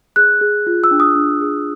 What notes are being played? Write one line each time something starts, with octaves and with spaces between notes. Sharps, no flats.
G#4 F#6
G#4
F4
E6
D4
D#6
D4
G#4